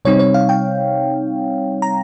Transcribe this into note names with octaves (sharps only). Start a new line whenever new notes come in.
C3 G3 C4 D#4 C#5
C#5
F5
G5
A#5